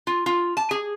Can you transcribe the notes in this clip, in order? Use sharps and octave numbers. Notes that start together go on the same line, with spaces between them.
F4
F4
A5
G#4